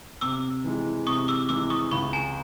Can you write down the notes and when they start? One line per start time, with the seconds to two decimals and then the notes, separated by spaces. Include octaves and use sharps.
0.21 C3 D6 E6
0.64 E3 G#3
1.07 C3 C#6 D#6
1.28 D6 E6
1.49 E3 G#3 D6 E6
1.70 C#6 D#6
1.91 C#2 B5 C#6
2.13 G#5 A#5